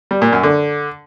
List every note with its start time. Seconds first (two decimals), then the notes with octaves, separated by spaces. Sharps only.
0.11 G3
0.22 A#2
0.32 F#2
0.43 D3